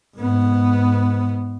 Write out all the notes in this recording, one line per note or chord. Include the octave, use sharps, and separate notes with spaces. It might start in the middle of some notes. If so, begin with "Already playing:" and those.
G#2 B3